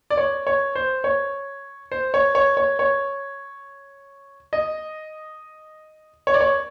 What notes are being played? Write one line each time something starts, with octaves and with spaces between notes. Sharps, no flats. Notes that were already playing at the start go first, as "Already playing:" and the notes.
D5
C#5
C#5
C5
C#5
C5
C#5
C#5
C#5
C#5
D#5
C#5
D5
C#5